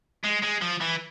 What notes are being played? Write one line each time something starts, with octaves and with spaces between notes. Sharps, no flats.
G#3
G#3
F3
E3